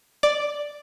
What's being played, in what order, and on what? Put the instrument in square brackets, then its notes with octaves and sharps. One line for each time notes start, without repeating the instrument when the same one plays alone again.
[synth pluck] D5